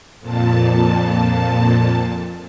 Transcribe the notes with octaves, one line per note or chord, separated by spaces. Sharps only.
F2 A#2 A5